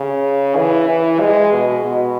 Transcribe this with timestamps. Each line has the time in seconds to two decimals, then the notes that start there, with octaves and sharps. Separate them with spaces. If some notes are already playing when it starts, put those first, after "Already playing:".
Already playing: C#3
0.57 E3
0.89 E3
1.21 G#3
1.53 B2
1.85 B2